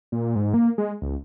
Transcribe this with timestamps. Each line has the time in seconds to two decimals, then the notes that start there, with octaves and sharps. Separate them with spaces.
0.12 A#2
0.35 G#2
0.54 A#3
0.78 G#3
1.02 C#2